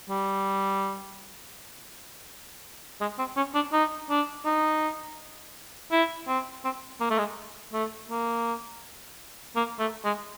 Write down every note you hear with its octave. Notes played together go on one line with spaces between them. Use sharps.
G3
G#3
C4
C#4
D4
D#4
D4
D#4
E4
C4
C4
A#3
A3
G#3
A3
A#3
A#3
A3
G#3